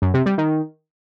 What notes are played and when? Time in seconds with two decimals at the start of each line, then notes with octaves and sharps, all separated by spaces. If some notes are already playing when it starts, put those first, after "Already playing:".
0.02 F#2
0.14 C3
0.26 G3
0.38 D#3